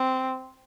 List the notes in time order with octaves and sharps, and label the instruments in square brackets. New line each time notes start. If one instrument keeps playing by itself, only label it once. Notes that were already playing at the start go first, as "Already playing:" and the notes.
Already playing: [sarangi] C4